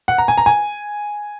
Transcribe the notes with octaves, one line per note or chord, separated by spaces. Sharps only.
F#5
A#5
G#5
A#5
G#5